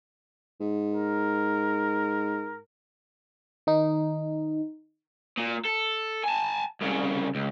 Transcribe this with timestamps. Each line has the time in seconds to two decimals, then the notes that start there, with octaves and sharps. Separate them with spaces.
0.60 G#2
0.94 A#4
3.67 D#3 D#4
5.37 A#2
5.65 A4
6.24 G#5 A5
6.81 C2 C#3
7.35 C#2